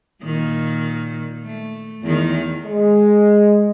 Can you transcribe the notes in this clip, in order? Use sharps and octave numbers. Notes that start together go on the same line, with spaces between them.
A#2 D#3
A3
E2 D#3
G#3